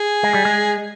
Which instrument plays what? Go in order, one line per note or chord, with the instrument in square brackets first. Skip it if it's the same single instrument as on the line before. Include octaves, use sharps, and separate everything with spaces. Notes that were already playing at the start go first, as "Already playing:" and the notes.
Already playing: [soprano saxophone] G#4
[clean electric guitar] G#3
G3
G#3